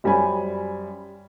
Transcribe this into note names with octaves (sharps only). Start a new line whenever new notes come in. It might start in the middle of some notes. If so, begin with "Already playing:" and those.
F#2 G3 C5 G#5 B5